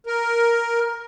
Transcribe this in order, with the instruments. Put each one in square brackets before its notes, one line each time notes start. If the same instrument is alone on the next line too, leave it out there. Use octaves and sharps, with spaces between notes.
[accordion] A#4